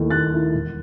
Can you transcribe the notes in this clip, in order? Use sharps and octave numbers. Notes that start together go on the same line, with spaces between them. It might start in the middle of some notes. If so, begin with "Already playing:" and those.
Already playing: D#2 D#3 A3 E4
D#2 F#6 A6
D#3 A3 E4
E1